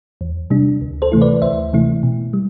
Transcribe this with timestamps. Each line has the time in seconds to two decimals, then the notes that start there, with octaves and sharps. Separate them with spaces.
0.21 E2
0.50 C3 G3 D4
0.81 D2
1.02 A4 C5
1.12 C3 E3 A3 E4
1.22 B4 D5
1.42 D2 C5 E5
1.73 C3 E3 A3 E4
2.03 B2
2.33 G3